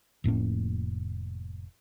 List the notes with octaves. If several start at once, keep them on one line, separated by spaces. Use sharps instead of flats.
F1 A2 A#3 C#4